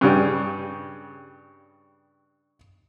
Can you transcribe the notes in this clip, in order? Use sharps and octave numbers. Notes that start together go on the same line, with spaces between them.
G2 C#3 G3